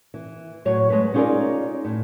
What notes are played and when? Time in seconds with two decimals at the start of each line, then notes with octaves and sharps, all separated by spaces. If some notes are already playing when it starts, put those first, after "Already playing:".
0.14 E3
0.65 A2 F#3 C#5
0.90 G#3 A3 B4
1.14 C#4 D#4 F4 G#4 A#4 D5
1.85 A2